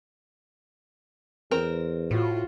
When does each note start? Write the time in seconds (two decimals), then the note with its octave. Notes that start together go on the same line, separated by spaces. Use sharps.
1.51 E2 C4 A#4
2.11 A2 F4 F#4